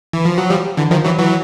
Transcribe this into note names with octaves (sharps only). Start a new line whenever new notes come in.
E3
F3
F#3
F3 G3
D3 E3
D#3 F3
E3 F#3
E3 F#3